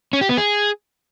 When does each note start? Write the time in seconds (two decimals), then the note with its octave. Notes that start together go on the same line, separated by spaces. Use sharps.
0.13 C#4
0.21 G4
0.29 B3
0.37 G#4